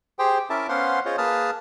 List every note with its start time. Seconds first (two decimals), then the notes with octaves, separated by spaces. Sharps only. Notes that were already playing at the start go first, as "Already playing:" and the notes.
0.19 G4 G#4 C5 G5
0.50 C#4 E4 A#4 E5 A5 D6
0.69 B3 C#4 C5 F5 F#5 C6
1.05 F4 G#4 C5 C#5 D#5
1.18 A#3 G#4 B4 A5 D#6 F6